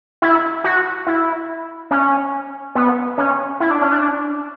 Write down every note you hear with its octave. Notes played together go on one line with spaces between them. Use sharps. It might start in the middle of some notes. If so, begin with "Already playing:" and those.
E4
F#4
E4
C#4
B3
C#4
E4
D4
C#4
D4